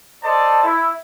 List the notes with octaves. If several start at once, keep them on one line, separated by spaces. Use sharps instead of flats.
A4 C5 D5 D#5 A5
E4